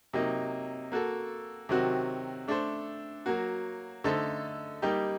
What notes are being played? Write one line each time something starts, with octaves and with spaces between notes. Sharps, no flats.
C3 F#3 A#3 D#4
A#3 F#4 A4
C3 D#3 F#3 C4 F#4
A3 D4 A4 C5
F#3 A#3 F#4
D3 A3 D#4 A4 C5
G3 A#3 D#4 G4